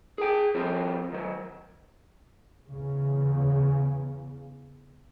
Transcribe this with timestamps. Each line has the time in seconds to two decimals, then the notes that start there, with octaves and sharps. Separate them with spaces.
0.18 G#4 G5
0.55 F3 C4 F4 F#4
1.12 D#3 F#3
2.70 E2 C#3